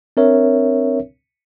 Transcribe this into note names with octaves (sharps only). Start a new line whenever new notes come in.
C4 D4 A#4 C#5 E5